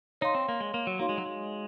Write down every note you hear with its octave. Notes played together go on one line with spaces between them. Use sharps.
D#4 C#5 F5 C6
C4
A#3
G#3
A#3
F#3
A#3 D#4 F#4 C#5 F5 C6
G#3
F#3
G#3